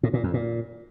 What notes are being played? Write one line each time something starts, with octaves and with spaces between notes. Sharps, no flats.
A2
A#2
F2
A#2